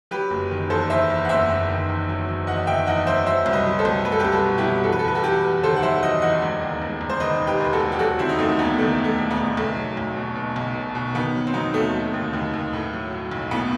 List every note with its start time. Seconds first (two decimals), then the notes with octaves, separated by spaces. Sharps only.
0.11 F#3 G4 B4
0.31 F#1
0.51 D#3
0.70 E2 A4 C5
0.90 E2 C5 E5
1.10 E2
1.25 F#5
1.29 F#1 C5 E5
1.49 F#1
1.69 D#3
1.89 E2
2.09 F#3
2.29 F#3
2.47 E2 D#5 F#5
2.67 D#3 E5 G5
2.87 E2 D#5 F#5
3.07 F#3 C5 E5
3.26 F#3 C5 E5
3.46 C2
3.53 B4 D#5
3.66 F#3
3.79 A4 C5
3.85 C2
4.05 C2 B4
4.12 A4
4.20 G4 B4
4.25 C2
4.32 F#4 A4
4.44 B2
4.58 E4 G4
4.64 F#3
4.84 E2 A4
4.92 B4
4.99 A4
5.04 E2 B4
5.15 F#4 A4
5.23 E2 G4 B4
5.44 E2
5.63 D#3 A4 C5
5.77 F#5
5.82 F#3 C5 E5
6.02 E2 D#5 F#5
6.22 E2 D#5 F#5
6.42 E1
6.61 D#2
6.82 E1
7.01 E1
7.10 C5
7.20 D#3 B4 D#5
7.41 E1
7.47 G4 B4
7.60 D#2 B4
7.73 F#4 A4
7.80 E1
7.92 G4
7.99 F#3 F#4 A4
8.19 D#3 C4 E4
8.29 D#4
8.38 D#2 A3 C4
8.59 E1 B3
8.79 D#3 A3
8.99 E1
9.04 A3
9.18 E1
9.31 B3
9.38 E1
9.47 B3
9.57 B1 A3
9.76 F#3
9.97 B1
10.17 B2
10.36 B2
10.56 B1
10.75 B2
10.95 B2
11.14 D#3 B3
11.35 F#3
11.47 C4
11.54 F#3 B3 D#4
11.74 D#2 A3
11.94 F#3
12.14 D#2
12.33 D#2
12.54 D#2
12.73 A2
12.93 F#3
13.12 F#3
13.31 B1
13.51 A2 B3